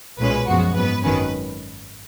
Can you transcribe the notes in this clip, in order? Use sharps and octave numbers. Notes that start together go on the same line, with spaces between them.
B1 A#2 G#3 C#4 B4
F#2 F3 G#3 B3 F#4
G#2 F#3 B3 B4
G#1 F#2 D#3 F#3 C#4 B4